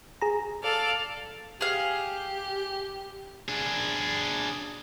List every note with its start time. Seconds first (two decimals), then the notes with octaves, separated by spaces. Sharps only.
0.21 G#4 A#5
0.63 A4 D5 F5
1.61 G4 G#4 F5
3.49 D4 G#4